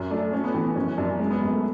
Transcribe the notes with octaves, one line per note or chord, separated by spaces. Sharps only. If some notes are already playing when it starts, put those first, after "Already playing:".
Already playing: F#2 C#4
A3 D4
A3 C#4
B3
E3 B3
B3
F#2 C#4
F#2 D4
G#3 C#4
B3
F#2
A3